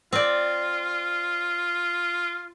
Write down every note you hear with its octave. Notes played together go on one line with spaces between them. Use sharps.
C4 F4 D5